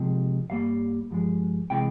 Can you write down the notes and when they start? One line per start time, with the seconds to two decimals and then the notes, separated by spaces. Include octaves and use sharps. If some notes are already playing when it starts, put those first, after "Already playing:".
Already playing: C2 C3 F3 G#3
0.50 G2 G3 A#3 F5
1.11 G2 F3 G#3
1.70 C3 E3 G#3 G5